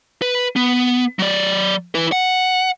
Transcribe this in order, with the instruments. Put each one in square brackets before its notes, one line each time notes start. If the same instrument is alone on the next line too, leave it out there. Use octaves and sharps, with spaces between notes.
[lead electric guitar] B4
B3
F#3 D5
E4 B4
F#5